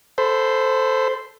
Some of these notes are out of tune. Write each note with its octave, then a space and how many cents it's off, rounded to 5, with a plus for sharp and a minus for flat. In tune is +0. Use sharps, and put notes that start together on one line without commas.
A4 +0 C5 +0 B5 +30